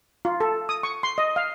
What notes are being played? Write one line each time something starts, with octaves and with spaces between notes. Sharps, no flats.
F4
A4
D#6
C#6
C6
D#5
F5